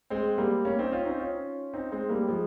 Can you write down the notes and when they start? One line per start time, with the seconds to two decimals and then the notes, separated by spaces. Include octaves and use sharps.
0.10 G#3 C4
0.38 G3 A#3
0.65 A#3 C#4
0.79 C4 D#4
0.92 C#4 F4
1.05 C4 D#4
1.19 C#4 F4
1.74 C4 D#4
1.92 G#3 C4
2.09 G3 A#3
2.27 F3 G#3